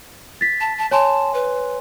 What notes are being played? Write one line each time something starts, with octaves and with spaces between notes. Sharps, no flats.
A6 B6
A5
A5
C#5 G#5 A5 C6
B4